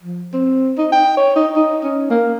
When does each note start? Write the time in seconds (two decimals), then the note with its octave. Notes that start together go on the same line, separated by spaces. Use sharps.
0.03 F3
0.34 C4
0.78 D#4
0.92 G5
1.17 C#5
1.36 D#4
1.56 D#4
1.84 C#4
2.10 A#3